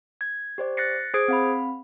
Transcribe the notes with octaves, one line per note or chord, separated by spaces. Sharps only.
G#6
G4 C5 D5
F#6 A6 A#6 C7 C#7
G#4 C5 D#6 G#6 C7 D7
C4 F5 B5